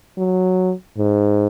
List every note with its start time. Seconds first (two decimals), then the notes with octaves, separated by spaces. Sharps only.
0.17 F#3
0.98 G#2